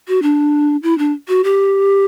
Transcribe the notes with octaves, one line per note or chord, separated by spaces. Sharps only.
F#4
D4
E4
D4
F#4
G4